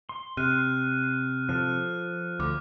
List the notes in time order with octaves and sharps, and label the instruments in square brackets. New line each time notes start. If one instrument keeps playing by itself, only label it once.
[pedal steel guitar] C6
[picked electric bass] C3 [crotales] F6 F#6 D#7
[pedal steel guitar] F3 A4 [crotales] F6
[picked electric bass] D2 [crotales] D6